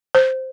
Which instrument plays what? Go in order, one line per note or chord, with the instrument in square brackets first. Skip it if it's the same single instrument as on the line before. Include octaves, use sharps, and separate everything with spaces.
[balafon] C5